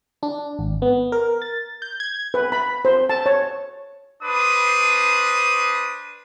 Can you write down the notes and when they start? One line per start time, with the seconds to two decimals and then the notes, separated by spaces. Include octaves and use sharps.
0.23 D4
0.59 G#1
0.82 B3
1.12 A#4
1.42 A6
1.82 G6
2.00 G#6
2.34 B4
2.52 B5
2.85 C5
3.09 A5
3.26 C#5
4.23 D4 B4 C5 D#6